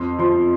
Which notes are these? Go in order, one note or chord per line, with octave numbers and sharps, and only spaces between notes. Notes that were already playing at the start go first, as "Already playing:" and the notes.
Already playing: F2 C6
F3 C6